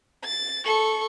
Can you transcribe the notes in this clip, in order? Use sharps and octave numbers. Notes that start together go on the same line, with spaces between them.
A6
A4 C#6